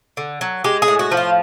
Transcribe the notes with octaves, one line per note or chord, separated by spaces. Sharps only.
D3
F#3
G#3 G4
G#4
A2
F#4
F3
F4